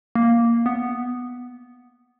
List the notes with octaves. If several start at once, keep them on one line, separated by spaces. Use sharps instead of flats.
A#3
B3